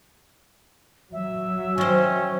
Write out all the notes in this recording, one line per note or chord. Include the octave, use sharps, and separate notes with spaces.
F#3 E5
D#3 C#4 C5